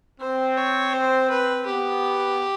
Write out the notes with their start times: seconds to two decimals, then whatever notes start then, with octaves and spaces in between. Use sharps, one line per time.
0.20 C4 C5
0.57 C#5
0.93 C5
1.30 B4
1.66 B3 G4